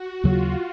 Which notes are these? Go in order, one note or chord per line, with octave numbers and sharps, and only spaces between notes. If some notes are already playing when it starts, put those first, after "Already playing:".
Already playing: F#4
D#2 C#3 F#3 F4